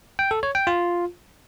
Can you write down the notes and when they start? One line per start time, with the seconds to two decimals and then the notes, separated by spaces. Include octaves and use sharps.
0.19 G5
0.31 A4
0.43 C#5
0.55 G5
0.67 F4